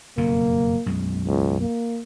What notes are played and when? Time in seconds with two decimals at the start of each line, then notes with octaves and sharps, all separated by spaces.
0.17 F#1 F2 B2 A#3
0.86 B1 F#2 G#3
1.27 C#2
1.60 A#3